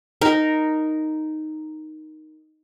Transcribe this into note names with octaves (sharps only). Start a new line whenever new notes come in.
D#4 A#4